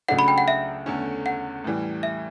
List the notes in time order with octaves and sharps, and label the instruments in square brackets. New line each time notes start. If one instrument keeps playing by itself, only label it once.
[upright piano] C#2 C#3 F#3 A3 D4 [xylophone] F#5
[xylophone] B5
G5
F#5
E5
[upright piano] E2 D3 A3 C#4
[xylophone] F#5
[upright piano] A2 E3 G3
[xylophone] E5